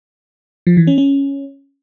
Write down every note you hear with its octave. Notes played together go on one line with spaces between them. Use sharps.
F3
E3
C#4
C#4